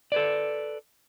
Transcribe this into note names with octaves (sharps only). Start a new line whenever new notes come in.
A4 B4 D5